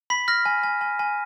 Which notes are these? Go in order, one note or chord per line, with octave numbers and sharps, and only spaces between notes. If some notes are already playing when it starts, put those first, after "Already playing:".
B5 B6
F6 A#6
G#5
G#5
G#5
G#5